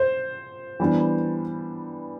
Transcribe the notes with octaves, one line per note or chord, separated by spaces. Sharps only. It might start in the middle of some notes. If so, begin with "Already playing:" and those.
Already playing: C5
E3 G3 B3 D4